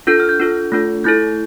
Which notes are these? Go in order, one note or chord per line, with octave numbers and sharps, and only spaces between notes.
D4 F4 A4 G6
F6
G6
D4 F4 A4
A3 D4 F4 A4
A3 E4 A4 G6